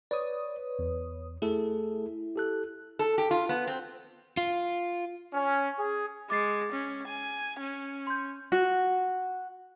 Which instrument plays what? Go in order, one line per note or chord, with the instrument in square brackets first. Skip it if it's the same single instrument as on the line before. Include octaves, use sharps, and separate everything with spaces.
[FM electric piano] B4 C#5 D#6 [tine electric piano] D5
[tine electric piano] E2
[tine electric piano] A3 G#4 A4 [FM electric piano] E4
[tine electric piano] G4 A4 F#6
[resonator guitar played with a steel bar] A4
G4
F4
B3
C4
[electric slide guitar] F4
[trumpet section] C#4
G#4
[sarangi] G#3 [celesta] D6 A6 C7
[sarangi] C#4
G#5
C#4
[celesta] C6 G6
[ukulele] F#4